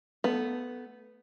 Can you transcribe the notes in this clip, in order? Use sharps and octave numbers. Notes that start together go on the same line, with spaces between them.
A3 B3 A4